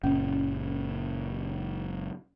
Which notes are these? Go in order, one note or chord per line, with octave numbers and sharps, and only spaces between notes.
F#1 A#2 C#4